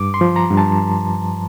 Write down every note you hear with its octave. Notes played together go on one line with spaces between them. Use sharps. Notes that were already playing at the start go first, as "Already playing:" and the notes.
Already playing: G2 D6
C6
F3
A#5
G2
A5